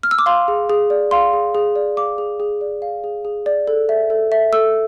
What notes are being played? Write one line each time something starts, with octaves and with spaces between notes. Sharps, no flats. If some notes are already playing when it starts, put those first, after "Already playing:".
F6
E6
D6
F5 C6
G#4
G#4
D5
F5 C6
G#4
G#4
D5
F5 D6
G#4
G#4
D5
F5
G#4
G#4
D5
A4
E5
A4
E5
A4 E6